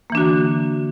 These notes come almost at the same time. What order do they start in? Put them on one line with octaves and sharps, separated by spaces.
A#3 E3 D4 F#4 D3